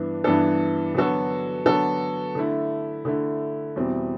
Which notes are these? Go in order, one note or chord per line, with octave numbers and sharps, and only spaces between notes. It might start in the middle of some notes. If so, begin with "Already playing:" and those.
Already playing: G2 E3 B3 D4
G2 E3 B3 D4 A4
D3 F#3 B3 F#4 A4
D3 F#3 B3 F#4 A4
D3 A3 E4
D3 A3 E4
E2 B2 G3 C4 E4